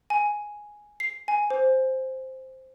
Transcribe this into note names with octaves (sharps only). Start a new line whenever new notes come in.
G#5
C7
G#5
C5